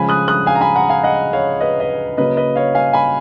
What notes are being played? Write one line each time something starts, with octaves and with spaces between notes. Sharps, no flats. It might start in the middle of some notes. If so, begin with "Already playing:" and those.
Already playing: C#3 F3 G#3 G#5 B5
D#6 F#6
D#6 F#6
F5 G#5
A#5
G#5 B5
F#5 A#5
F5 G#5
D#5 F#5
C#5 F5
B4 D#5
B4 D#5
C#3 F#3 A#3 B4 D#5
B4 D#5
C#5 F5
F5 G#5
G#5 B5